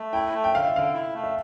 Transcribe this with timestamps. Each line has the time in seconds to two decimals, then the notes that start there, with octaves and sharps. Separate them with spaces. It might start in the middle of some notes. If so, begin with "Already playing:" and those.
Already playing: A3
0.13 E4 G5
0.33 A3
0.44 G5
0.54 D3 F5
0.65 E5
0.74 D3 F5
0.94 E4
1.14 A3
1.24 E5